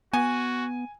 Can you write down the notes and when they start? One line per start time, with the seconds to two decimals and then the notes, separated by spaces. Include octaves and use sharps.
0.13 B3 F#4 G#5